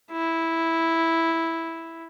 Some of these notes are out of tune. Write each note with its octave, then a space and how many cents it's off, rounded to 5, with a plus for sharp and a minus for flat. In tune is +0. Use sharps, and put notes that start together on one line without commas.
E4 -5